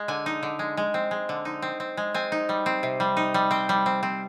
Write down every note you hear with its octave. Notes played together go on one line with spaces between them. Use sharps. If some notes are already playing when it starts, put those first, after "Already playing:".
Already playing: G#3
D3 G#5
D#4
D3
G#3
G#3
C4
G#3
D3
D#4
C4
C4
G#3
C4 G#5
D#4
G3
C4
C3
G3
D#4
G3
C4 G5
G3
C4
C4